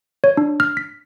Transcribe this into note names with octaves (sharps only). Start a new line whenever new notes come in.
C#5
D4
F6
B6